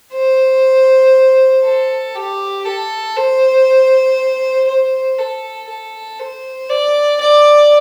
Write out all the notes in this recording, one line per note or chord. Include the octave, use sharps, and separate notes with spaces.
C5
A4
G4
A4
C5
C5
A4
A4
C5
D5
D5